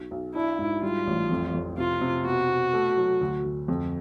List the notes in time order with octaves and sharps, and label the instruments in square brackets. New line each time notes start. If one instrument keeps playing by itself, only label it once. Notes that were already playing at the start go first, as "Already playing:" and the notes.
Already playing: [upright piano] B1
B1
[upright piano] D4 [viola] E4
[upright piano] G#2
[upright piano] G3 [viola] F4
[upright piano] A1
F2
F2
[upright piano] C3 [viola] F4
[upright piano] C3
[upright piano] B2 [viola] F#4
[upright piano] B2
A3
F#3
D2
D2
F2